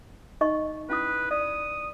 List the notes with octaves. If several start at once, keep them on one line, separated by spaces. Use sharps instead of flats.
D#4 D#5 C#6
C#4 E4 B4 D#6
D5 D#6